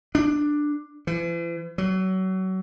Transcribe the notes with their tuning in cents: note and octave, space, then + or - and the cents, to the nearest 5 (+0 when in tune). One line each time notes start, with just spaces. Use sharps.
D4 +10
E3 +45
F#3 +30